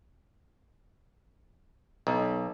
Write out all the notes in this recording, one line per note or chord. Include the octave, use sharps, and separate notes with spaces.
B1